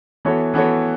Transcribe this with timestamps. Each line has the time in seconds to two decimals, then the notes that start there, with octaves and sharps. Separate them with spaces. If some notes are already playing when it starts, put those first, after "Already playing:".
0.25 E3 B3 F#4 A4 C#5
0.54 E3 B3 F#4 A4 C#5